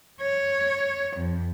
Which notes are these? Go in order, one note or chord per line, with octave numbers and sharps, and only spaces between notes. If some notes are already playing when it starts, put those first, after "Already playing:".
C#5
F2